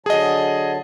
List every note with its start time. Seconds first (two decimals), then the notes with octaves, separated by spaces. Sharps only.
0.06 D3 F#3 G#4 D#5 A5